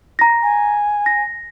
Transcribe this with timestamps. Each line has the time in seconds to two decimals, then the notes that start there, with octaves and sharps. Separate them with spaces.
0.19 A#5 A#6
0.43 G#5
1.06 A#6